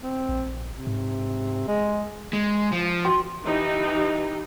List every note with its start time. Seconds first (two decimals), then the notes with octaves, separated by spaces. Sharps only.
0.03 C4
0.29 A#1
0.72 C3
0.87 G#2
1.68 G#3
2.33 G#3
2.72 F3
3.05 F#4 G5 C6
3.44 E3 D#4 G4